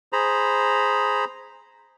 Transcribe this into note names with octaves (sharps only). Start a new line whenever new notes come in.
G#4 C5 A#5 B5